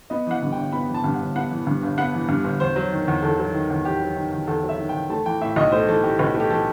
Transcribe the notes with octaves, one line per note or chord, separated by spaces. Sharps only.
B3 D#5
E3 F#5
G2
G1 G5
B3 B5
E3
A5
G2
F#5
G1
B3 F#5
E3
G2
G1
B3 F#5
E3
G2
G1
E2 C5
F#3
D#3
E2
E2 A4
F#3
D#3
E2
E2 G4
F#3
D#3
E2
E2 A4
F#3
E5
D#3
G5
E2
A3 A5
E3 G5
A2 E5
B1 D#5
A3 C5
E3 A4
A2 G4
B1 B4
A3
G4
E3 A4